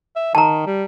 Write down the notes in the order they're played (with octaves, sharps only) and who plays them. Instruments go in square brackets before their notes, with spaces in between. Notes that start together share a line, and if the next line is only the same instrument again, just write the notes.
[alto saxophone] E5
[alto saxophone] D#3 [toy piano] A5 A#5
[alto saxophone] G3